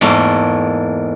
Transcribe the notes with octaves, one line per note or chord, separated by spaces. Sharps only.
E2 G#2 A3 A#3